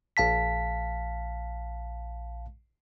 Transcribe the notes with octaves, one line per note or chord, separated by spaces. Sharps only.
A#1 F5 A5 B6